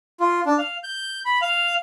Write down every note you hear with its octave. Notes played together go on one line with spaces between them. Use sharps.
F4
D4
F5
G6
B5
F5